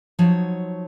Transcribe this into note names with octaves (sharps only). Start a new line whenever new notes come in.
F3 F#3 D#4 C#5